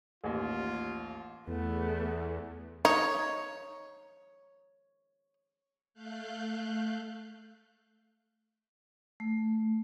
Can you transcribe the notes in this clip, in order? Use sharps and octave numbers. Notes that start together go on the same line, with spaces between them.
A1 D#2 F4
E2 A3 B3
D#4 C#5
A3 F5 F#6 G6
A3